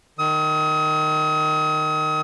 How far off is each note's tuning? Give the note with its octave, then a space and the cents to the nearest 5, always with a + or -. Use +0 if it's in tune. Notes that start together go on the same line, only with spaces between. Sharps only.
D#3 -15 D#6 +35